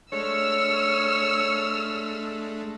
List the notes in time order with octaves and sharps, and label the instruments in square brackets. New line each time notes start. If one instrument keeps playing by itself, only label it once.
[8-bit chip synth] G#3 A3 D4 [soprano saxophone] C#5 [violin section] E6 F6